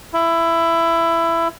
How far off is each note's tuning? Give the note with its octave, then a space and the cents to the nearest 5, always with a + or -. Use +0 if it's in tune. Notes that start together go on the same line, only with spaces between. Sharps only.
E4 +15